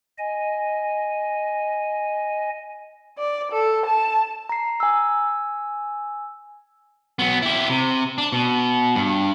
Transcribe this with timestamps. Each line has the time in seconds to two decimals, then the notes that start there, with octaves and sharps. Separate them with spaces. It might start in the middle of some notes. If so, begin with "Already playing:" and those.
0.18 D#5 G#5
3.18 D5
3.52 A4
3.86 A5
4.49 A#5 C7
4.80 G#5 E6
7.19 F#3 B3
7.42 E4 G4
7.70 C3
8.18 D4
8.32 B2
8.95 G2